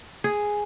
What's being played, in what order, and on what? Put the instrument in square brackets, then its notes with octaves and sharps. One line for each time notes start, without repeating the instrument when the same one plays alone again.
[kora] G#4